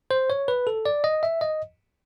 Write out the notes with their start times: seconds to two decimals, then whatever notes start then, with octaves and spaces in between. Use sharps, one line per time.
0.11 C5
0.30 C#5
0.48 B4
0.67 A4
0.86 D5
1.04 D#5
1.23 E5
1.41 D#5